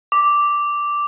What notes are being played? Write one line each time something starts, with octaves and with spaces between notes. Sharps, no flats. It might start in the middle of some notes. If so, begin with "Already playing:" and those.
D6